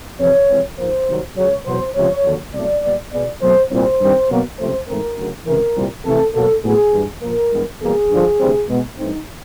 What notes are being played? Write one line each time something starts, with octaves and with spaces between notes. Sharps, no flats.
F2 C3 E3 C#5
F2 C3 E3 G#3 C4
G#2 F3 A#3 C5
C2 C3 D#3 F#3
C#2 C#3 F#3 C#5
E2 B2 F#3 B3 C5
C#2 C3 F3 C#5
D#2 D3 F#3
C2 B2 F#3 A3 D5
A#2 G3 B3
B2 G#3 B3 D5
B2 F#3 A3 C4 C5
C2 A#2 G3 C5
G2 D#3 G3 C4
B2 F#3 A#3
C#2 C3 F3 A3 C5
G#2 E3 A3 C4 A#4
D2 C#3 F#3
C#2 C3 E3 A#4
C2 A#2 G3 C4
F2 C3 E3 A3 C4 A4
B2 F#3 A#3 A4
A2 F#3 B3 G#4
G2 E3 G3
A#2 F3 A#3 A#4
G2 E3 G#3 B3
E2 B2 G3 A#3 G#4
G2 D3 F3
D2 C3 E3 G3 C4
B2 G#3 B3
G2 E3 A3 C4 D#4